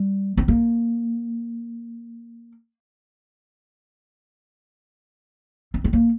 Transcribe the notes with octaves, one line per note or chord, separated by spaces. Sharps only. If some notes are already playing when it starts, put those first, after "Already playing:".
Already playing: G3
C4
A#3
C4
C4
A#3